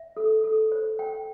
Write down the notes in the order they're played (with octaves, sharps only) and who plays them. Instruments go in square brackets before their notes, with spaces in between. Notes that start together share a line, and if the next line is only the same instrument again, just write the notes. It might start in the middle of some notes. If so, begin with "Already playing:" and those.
Already playing: [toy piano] E5
A4
A4
C5
G5